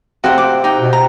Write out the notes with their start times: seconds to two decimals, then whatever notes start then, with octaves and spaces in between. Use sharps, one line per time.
0.24 C3 F#4 G4 C5 F#5
0.38 D6
0.64 D#4 G5
0.80 B2
0.93 A#5